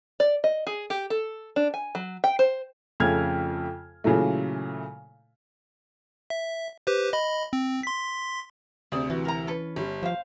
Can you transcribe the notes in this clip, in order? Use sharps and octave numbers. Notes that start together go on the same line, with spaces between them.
D5
D#5
G#4
G4
A4
D4
G#5
F#3
G5
C5
F2 C#3 A3 F6 G#6
A#2 C#3 E3 F#3 A3
E5
G4 B4 C5
D#5 B5
C4
C6 B6
D2 C3 G#4 C5 D5
E3 F#4
A#4 A#5
C#4 A4 B4
G1 G3
F3 C5 F5